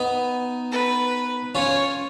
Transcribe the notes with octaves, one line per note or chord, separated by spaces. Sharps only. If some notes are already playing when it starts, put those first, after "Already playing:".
Already playing: B3 D#4
B4
C#4 F4 C#5